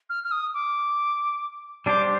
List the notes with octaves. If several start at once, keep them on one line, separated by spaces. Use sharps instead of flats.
F6
F6
D#6
D6
G3 D4 G4 C5 D6